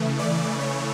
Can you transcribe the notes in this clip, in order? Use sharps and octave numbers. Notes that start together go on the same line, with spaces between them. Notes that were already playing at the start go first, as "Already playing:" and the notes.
Already playing: C#3 E3 A3
D5
C#5